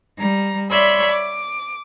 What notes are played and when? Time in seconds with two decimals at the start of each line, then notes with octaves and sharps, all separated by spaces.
0.17 G3 A#5
0.71 C#5 D5 E5 B5 C6
1.10 D6